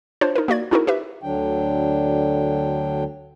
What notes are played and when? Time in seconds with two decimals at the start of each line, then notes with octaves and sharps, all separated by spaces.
0.21 D4 F4 C5 C#5
0.36 D#4 A#4
0.48 A#3 F#4 D5 G#6
0.71 C#4 D#4 E4 F#4 G#4 A#4
0.87 G4 B4 E5
1.21 D2 D3 F#3 D4 G5